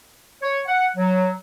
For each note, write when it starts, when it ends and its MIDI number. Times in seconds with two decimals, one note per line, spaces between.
0.42 0.60 73
0.66 0.87 78
0.97 1.30 54